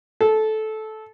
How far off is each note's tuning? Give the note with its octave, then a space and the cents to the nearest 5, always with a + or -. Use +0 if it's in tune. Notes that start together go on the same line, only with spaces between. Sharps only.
A4 -15